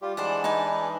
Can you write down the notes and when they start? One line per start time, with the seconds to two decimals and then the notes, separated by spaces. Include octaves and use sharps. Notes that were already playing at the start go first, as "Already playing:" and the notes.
0.02 G3 F4 G4
0.17 E3 G#3 D4 C5 D5 F#5
0.44 D#4 B4 G#5